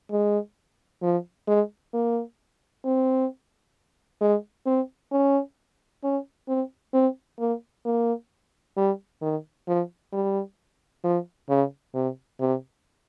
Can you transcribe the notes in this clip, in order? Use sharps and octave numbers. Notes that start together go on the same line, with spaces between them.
G#3
F3
G#3
A#3
C4
G#3
C4
C#4
C#4
C4
C4
A#3
A#3
G3
D#3
F3
G3
F3
C#3
C3
C3